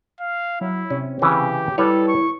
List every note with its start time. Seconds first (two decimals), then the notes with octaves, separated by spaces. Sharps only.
0.20 F5
0.61 F#3 E4
0.90 C3 C#4
1.22 C#3 E3 C#4 G4
1.78 G3 E4 A4 B4 C#5
2.08 C#6